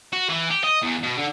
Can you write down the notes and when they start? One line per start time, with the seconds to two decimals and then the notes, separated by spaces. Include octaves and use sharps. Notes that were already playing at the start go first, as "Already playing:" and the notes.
0.13 F#4
0.29 E3
0.50 G4
0.64 D#5
0.82 E2
1.03 B2
1.16 D3